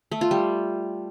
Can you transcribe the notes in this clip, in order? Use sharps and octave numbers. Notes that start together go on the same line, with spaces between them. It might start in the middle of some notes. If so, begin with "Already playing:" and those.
A3
F4
G3